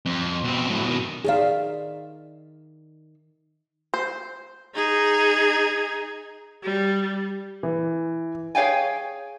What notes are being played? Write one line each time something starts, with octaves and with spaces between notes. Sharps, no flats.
F2
B2 C4
A2 F#3
B2 D#3
D#3 G#4 D5 E5 F5
C5
D#4 G#4
G3
E3
G#4 C#5 F5 G5 G#5